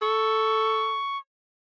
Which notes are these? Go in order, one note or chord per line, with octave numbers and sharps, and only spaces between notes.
A4 C#6